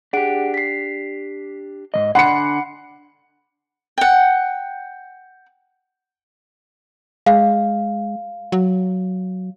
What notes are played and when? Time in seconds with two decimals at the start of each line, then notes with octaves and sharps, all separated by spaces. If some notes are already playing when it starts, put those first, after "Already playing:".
0.13 D4 G4 G#4 F#5 D7
0.54 B6 C7
1.94 G#2 E3 D#5
2.15 D3 D4 F#5 G#5 B5 C6 C7 C#7
3.98 F#5 G5
7.26 G#3 F5
8.52 F#3